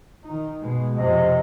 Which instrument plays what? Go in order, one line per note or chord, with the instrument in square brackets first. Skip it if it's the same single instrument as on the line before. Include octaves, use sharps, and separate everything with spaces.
[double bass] D#3 D#4
B2 G#3
[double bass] F2 C3 [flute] D#5